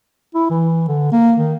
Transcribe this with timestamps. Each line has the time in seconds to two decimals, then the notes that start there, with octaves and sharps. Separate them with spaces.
0.35 E4
0.50 E3
0.88 D3
1.12 A#3
1.38 D#3